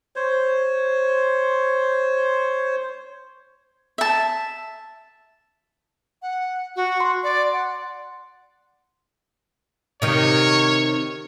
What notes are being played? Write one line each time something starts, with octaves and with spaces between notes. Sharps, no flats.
C5 C#5
E5 A5
F#5
F#4
C6
D5
F#5
C3 D#3 C#5